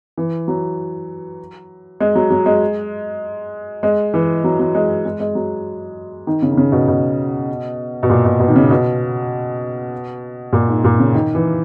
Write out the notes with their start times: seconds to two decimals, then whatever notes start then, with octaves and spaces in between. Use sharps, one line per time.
0.18 E3
0.48 F#3
2.00 G#3
2.15 F#3
2.30 F#3
2.46 G#3
3.83 G#3
4.14 E3
4.44 F#3
4.60 F#3
4.75 G#3
5.05 G#3
5.20 G#3
5.35 F#3
6.27 D#3
6.42 C#3
6.52 D#3
6.57 C#3
6.72 B2
6.88 B2
8.03 B2
8.10 A#2
8.25 B2
8.40 B2
8.48 D#3
8.56 C#3
8.71 B2
10.53 A#2
10.68 G#2
10.84 A#2
10.99 C#3
11.14 D#3
11.35 E3